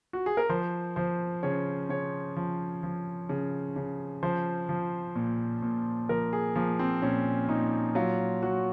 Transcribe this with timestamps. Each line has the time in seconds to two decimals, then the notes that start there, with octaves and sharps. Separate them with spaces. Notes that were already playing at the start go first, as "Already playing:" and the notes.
0.13 F#4
0.26 G#4
0.37 A#4
0.49 F3 C5
0.96 F3 C5
1.43 C#3 C#5
1.89 C#3 C#5
2.36 F3
2.83 F3
3.29 C#3
3.76 C#3
4.23 F3 C5
4.69 F3
5.15 A#2
5.62 A#2
6.09 F3 A#4
6.33 G#4
6.56 F3 A#3
6.79 C4
7.02 A#2 C#4
7.49 A#2 D#4
7.95 F#3 F4
8.43 F#3 F#4